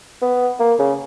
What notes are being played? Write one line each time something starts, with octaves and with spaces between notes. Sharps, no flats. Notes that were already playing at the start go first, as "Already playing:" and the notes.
B3
A#3
C#3